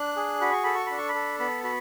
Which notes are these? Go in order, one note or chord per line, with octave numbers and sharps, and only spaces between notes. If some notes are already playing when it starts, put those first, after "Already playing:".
Already playing: D4 F#6
G#4
F#4 B5
C#6
A4 B5
C#6
D4 B5
C#6
B5
A4
B3 B5
F#4 B5